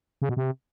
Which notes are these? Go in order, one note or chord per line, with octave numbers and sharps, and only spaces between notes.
C#3
B2
C3